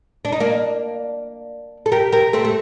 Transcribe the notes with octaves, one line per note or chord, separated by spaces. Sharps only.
D4
D#4
A#3 D4
A4
G4 A#4
G4 A#4
A3 C4
A3